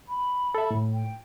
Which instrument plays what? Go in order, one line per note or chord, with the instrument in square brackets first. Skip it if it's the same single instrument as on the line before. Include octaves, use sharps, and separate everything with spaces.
[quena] B5
[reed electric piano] A4 E5
A2
[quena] G5